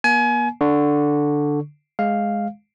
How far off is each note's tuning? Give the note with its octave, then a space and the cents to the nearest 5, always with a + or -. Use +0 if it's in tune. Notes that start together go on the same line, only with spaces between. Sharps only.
A#3 +45 G#5 +30
D3 +0 C#6 +0
G#3 +0 F5 +0